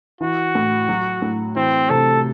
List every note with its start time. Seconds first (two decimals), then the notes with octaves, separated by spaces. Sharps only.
0.21 E3 F#4
0.55 A2
0.89 F#3
1.22 A2
1.56 E3 C4
1.90 C3 A4